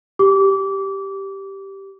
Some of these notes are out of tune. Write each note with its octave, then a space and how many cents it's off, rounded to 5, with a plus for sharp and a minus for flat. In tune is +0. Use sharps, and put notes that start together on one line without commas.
G4 -5 D6 -25